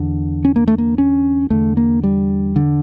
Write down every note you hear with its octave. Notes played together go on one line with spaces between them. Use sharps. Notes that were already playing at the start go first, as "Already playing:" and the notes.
Already playing: E2 D3
C#4
A#3
A3
A#3
C#4
E2 D3 A3
A#3
G3
D3